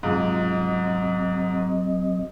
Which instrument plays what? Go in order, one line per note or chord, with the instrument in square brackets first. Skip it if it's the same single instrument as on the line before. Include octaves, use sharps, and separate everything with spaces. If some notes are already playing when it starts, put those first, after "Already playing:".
[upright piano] G#2 C3 F3 [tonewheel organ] F#3 C4 D#5